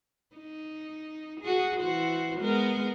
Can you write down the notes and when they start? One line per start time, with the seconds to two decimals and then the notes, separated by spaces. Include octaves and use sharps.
0.36 D#4
1.41 F#4 G#4
1.81 E3 F#4 C5
2.40 G#3 B3 A#4